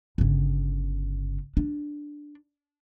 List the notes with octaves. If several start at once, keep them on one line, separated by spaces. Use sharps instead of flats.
G1 C#3
D4